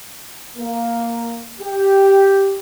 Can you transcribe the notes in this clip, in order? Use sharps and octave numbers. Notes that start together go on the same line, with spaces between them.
A#3
G4